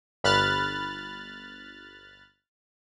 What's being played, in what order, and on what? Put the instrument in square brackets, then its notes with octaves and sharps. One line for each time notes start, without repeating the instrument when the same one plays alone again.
[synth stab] G1 B5 F6 F#6 A6